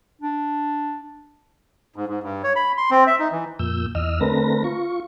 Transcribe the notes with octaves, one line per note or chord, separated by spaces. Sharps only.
D4
G#2
G#2
G2
C#5
B5
C6
C4
E5
D#4
E3
F2 A#2 E6 G6
E2 D#5 E6 F6
D3 A3 C4 A#4 B4 A#6
F4 C#6